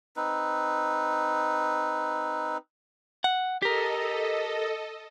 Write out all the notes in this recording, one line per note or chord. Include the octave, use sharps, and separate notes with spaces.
C4 D#4 B4
F#5
G4 A4 A#4 D#5